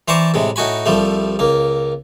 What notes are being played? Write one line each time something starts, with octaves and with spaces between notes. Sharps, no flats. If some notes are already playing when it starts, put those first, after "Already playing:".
E3 C5 D5 A5 A#5 C#6
A2 C3 G#3
A2 D#4 F#4 G#5 B5
C2 F3 G3 A3
C#2 A#3